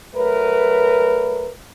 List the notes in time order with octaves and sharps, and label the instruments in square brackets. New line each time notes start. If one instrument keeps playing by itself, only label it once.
[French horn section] F#3 A3 A#4 B4